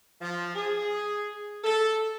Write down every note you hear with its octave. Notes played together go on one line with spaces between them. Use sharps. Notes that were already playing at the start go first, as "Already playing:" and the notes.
F3
G#4
A4